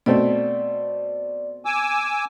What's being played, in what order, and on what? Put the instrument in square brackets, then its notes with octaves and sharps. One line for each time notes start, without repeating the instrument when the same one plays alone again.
[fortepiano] B2 A3 C4 [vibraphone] D5
[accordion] G#5 D6 E6